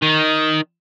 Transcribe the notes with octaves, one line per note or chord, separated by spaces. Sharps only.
D#3